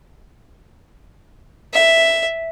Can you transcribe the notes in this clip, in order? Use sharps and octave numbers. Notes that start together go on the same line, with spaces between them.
E5